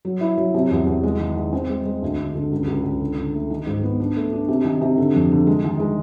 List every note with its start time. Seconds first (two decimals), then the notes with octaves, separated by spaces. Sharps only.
0.05 F#3
0.21 E4
0.37 F#3
0.54 C3
0.71 E2
0.86 E2
1.03 G#3
1.20 D#3
1.36 D#3
1.53 C4
1.70 G#3
1.85 G#3
2.02 D2
2.19 D3
2.35 D3
2.52 C#2
2.67 C#2
2.84 C#2
3.00 D3
3.18 D3
3.34 A3
3.50 D#3
3.66 G#2
3.83 B3
4.00 D4
4.16 A3
4.33 D4
4.48 C3
4.65 D#3
4.81 C3
4.98 D3
5.15 F2
5.31 D3
5.47 G#3
5.64 D#3
5.80 G#3